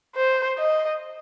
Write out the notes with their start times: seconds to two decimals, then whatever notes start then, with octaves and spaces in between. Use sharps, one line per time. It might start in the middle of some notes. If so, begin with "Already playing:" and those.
0.16 C5
0.58 D#5